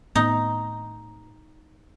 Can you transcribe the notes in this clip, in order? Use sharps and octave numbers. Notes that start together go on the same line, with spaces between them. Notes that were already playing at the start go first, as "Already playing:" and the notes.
A2 B3 D#4